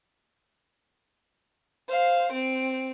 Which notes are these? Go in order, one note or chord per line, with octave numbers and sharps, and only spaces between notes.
C5 F5
C4 D7